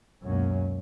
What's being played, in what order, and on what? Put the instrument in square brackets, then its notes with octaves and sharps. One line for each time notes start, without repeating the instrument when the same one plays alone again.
[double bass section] C#2 B2 A#3 C#4 [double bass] F#2